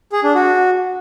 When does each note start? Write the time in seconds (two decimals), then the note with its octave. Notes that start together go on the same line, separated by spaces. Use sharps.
0.13 G#4
0.24 D4
0.35 F#4